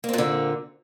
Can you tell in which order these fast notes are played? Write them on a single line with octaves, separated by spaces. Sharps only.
A#3 C4 A#2 D3